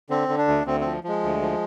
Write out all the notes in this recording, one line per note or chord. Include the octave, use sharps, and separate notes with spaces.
D3 C4
D3
D4
D2
D2 C4
F3 C4
F3 G#3
D2
F3